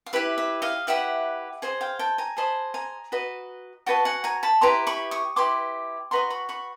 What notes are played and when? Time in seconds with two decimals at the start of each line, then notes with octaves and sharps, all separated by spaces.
0.06 F5
0.13 E4 G4 B4 E5
0.38 E5
0.62 D#5 F5
0.87 E4 G4 B4 E5 F#5
1.62 G#4 C5 D#5
1.81 F5 G5
1.99 G5 A5
2.18 G#5 A#5
2.37 G#4 C5 D#5 A5 B5
2.74 G#5 A#5
3.12 F#4 B4 D#5
3.86 F#4 B4 D#5 G5 A5
4.05 F#5 G#5
4.24 G#5 A#5
4.43 A5 B5
4.61 E4 G4 B4 A#5 C6
4.87 B5 C#6
5.11 C#6 D#6
5.36 E4 G4 B4 C6 D6
6.11 F#4 B4 D#5 A#5 C6
6.30 B5 C#6
6.49 B5 C#6